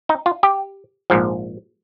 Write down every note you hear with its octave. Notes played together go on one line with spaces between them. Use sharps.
D#4
F4
G4
A#1 G#2 F3